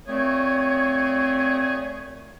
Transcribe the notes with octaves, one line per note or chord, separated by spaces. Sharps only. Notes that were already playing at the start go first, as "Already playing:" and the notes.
A#2 A3 C4 G#4 C#5